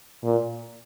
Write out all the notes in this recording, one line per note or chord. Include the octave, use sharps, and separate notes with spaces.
A#2